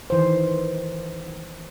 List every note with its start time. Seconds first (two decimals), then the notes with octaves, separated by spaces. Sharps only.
0.10 D#3 E3 C5